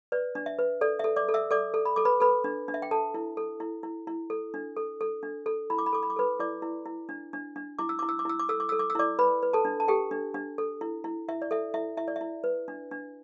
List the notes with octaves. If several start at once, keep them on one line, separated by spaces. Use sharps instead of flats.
B4 D5
D4
E5
B4
A4 D5
A4 E5
D5 D6
A4
E5 E6
A4 D5 D6
A4
B5
A4 D6
B4 B5
A4 B4 B5
D4
D4
E5
G5
A4 A5
E4
A4
E4
E4
E4
A4
D4
A4
A4
D4
A4
E4 B5
D6
B5
A4 D6
B5
D6
A4 B4 B5
E4 D5 D6
E4
E4
D4
D4
D4
E4 D6
E6
E4 D6
E6
D6
E4 E6
D6
A4 E6
D6
A4 E6
D6
E6
E4 D5 D6
B4 B5
B4
A4 A5
D4
A5
G4 A4 G5
D4
D4
A4
E4
E4
E4 E5
D5
A4 E5
E4 E5
E4 E5
D5
E5
E4
B4
D4
D4